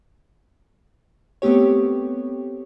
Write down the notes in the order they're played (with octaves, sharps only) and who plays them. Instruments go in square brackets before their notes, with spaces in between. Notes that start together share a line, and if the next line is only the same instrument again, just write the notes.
[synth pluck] A3 B3 C4 G4 C#5